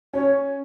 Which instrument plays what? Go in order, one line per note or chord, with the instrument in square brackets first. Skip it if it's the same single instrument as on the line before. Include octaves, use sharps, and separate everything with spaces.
[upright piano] C#4 [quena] C#5